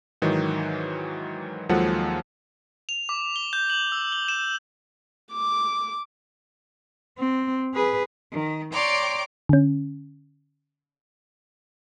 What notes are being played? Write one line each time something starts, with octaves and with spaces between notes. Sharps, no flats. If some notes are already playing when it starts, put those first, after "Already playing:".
G#2 D#3 E3 F#3
D#2 F3 F#3 G#3 A4 F#5
F7
D6
G7
G6
F#7
E6
G7
E7
D6
C4
G#4 B4
D#3
C#5 D5 G5 A#5 C6 D6
D3 C#4